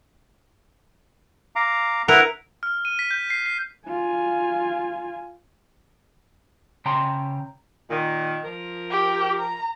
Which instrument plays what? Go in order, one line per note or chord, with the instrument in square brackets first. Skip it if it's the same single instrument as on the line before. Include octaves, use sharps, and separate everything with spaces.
[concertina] F5 A#5 D6
[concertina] E4 B4 F#5 [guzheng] A#4
[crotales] F6
D#7
B6
G6
C7
C7
[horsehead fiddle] F4 G#5
[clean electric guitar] C#3 G5 A#5 C6
[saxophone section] A#2 D#3
F3 A#4
[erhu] G4
A#5